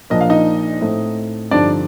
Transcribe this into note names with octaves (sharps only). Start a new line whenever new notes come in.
A#1 A#2 F3 A#3 D4 D#5
F5
D#4 D#5
A2 A3 C4 D#4
G2 D3 F3 C4 D4 D#4 D5